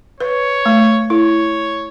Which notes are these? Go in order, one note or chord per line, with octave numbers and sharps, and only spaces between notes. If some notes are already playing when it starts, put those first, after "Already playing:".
B4 C#5
A3
E4 C#5